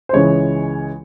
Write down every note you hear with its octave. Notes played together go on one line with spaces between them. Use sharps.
C5
C#2 C#3 E3 G#3 C#5